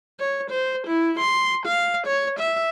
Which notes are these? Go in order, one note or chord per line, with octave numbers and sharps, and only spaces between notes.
C#5
C5
E4
C6
F5
C#5
E5